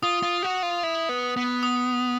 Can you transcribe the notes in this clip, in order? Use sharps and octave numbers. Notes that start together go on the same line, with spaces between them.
F4 D#6
F4
F#4
F4
E4
B3
B3
D#6